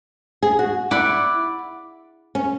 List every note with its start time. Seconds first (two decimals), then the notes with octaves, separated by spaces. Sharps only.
0.43 G#4
0.59 F#4
0.91 E4 D5 F#5 B5 D6
2.35 C#4